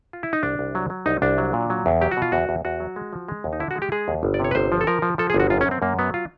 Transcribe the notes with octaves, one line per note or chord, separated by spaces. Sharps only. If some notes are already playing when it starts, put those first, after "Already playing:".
F4
E4
D#4
C2 D4
C2
F#3
F#3
C2 D#4
C2 D4
F#3
A#2
F#3
E2
F#3 G4
F#4
B2 F4
E2 F#4
E2
E2 F#4
F#3
G#3
F3
G#3
D#2
D#4
D3 E4
F#4
G#3
G4
G#3 G#4
D#2
G1
D5
C3 C#5
B4
G1 C5
F3
A4
F3 A#4
F3
F3 A4
G#4
G1
F#4
F#2 F4
C#4
F#2
C4
F#2 A#3
F#3 B3
F4